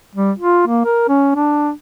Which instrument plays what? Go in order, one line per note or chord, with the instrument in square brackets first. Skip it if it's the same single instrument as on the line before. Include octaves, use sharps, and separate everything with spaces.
[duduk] G3
F4
A#3
A#4
C#4
D4